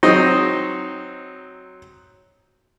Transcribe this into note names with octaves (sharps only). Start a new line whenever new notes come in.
F#3 C4 D#4 D#5